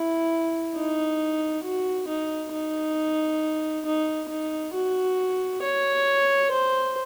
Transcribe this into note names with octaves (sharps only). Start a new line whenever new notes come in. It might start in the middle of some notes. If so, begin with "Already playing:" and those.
Already playing: E4
D#4
F#4
D#4
D#4
D#4
D#4
F#4
C#5
C5